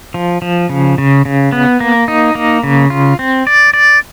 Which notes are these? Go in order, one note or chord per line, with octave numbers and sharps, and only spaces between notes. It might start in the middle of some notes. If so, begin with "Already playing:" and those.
F3
F3
C#3
C#3
C#3
B3
A#3
D#4
A#3
C#3
F4
C4
D5
D5